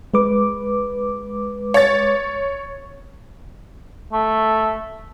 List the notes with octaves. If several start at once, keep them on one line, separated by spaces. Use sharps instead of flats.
G#3 B4 D6
C#5 A6
A3